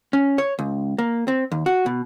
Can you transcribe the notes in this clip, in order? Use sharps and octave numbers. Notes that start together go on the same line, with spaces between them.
C#4
C#5
C#2
A#3
C4
D#2
F#4
B2